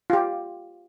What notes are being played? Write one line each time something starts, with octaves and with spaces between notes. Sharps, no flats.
F4 G4